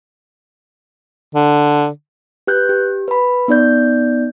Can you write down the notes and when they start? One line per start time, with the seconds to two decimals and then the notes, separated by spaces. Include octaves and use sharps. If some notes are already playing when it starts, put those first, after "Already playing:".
1.35 D3
2.47 G4 B4 F#6 G6
2.69 G4
3.08 B4 B5
3.48 B3 D#4 D5 G6